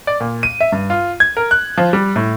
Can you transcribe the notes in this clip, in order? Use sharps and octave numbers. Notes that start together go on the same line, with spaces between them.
D5
A#2
D#7
E5
G2
F4
G#6
A#4
F#6
F3
G3
A2